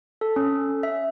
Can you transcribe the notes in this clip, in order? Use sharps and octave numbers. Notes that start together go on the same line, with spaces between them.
A4
C#4
E5